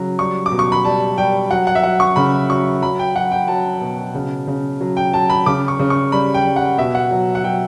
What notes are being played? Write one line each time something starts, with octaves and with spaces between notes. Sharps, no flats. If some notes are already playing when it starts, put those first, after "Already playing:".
Already playing: C#3 F#3
G3 C#6
D6
B2
C#6
B5
G3 A5
G3 G5
F#3 F#5
F#5
E5
F#3 F#5
C#6
C#3 B5
F#3 C#6
F#3 B5
G5
F#3 F#5
G5
F#3 A5
B2
C#3
C#3
F#3
G5
F#3 A5
B5
C#3 D6
C#6
C#3
C#6
G3 B5
G5
G3
F#5
B2 E5
F#5
F#3
F#5
F#3 G5